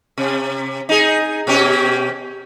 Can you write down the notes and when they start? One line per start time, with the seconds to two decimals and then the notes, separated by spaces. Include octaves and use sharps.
0.18 C3
0.89 D#4 G#4
1.47 B2 C#4 G4